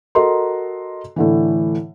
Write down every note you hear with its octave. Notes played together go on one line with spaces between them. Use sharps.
F#4 A4 A#4 D#5 A#5 C6
A2 D3 E3